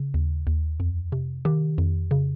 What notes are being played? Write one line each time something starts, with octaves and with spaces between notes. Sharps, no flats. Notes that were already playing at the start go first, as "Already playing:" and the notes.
Already playing: C#3
D#2
D#2
F2
C3
D#3 G4
F2
C#3